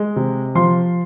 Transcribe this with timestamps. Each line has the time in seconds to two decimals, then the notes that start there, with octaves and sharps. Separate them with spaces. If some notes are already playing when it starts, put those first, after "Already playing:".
Already playing: G#3
0.16 C3
0.55 F3 C6